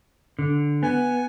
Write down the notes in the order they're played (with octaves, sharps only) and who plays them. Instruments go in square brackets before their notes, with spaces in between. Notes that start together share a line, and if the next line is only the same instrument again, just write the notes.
[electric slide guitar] D3
[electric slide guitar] B3 [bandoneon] G#5